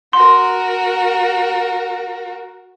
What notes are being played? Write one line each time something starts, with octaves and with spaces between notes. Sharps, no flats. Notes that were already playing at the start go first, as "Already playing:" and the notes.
F#4 A#4 C6